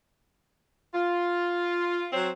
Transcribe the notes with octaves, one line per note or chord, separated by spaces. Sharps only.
F4
F#3 C4 C5 C#5